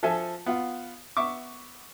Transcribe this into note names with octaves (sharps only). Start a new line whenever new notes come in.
F3 A4 E5 G#5
B3 F4
B3 E5 C#6 D6